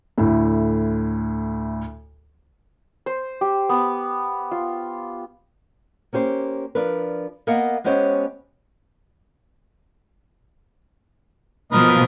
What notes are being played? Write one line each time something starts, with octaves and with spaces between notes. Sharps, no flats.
D2 A2
C5
G4
B3
F4
A#3 C#4 G4 C5
F3 D4 A#4 B4
A#3 B3 A#4 D#5 F5 F#5
G#3 B3 C#4 G4 C5 C#5
B2 F3 A#4 B4 D#5